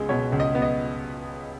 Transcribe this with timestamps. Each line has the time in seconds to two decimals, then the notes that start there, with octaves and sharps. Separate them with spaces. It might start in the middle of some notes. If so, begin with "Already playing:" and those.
Already playing: C#2 G#3 B3 D#5
0.09 B2 C#5
0.32 C#2
0.40 D#5
0.55 B3
0.62 D#5